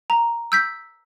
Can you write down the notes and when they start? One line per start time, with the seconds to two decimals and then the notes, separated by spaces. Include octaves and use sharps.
0.10 A#5
0.52 E6 G6 B6